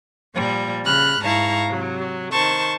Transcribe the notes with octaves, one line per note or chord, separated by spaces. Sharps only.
A#2 F3 G3
C#3 B5 F6 F#6
G#2 E4 F5 A5 A#5 C#6
C3 F#3
D#3 C5 A5 C#6